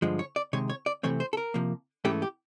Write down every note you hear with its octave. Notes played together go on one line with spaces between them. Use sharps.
G2 D3 F3 G#3
C#5
D5
C3 D#3 G#3 C#5
C#5
D5
C3 E3 A3 C4 C#5
C5
A4
A#4
C3 F3 A#3
G#2 E3 A3 C#4 G4
G4